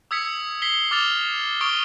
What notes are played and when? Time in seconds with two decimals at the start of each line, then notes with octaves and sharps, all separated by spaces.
0.11 D#6 E6 G#6 B6 C#7
0.62 B6 C7 G7
0.91 D6 F6 A6 F7 G7
1.61 C#6 D#6 F6 D7 G7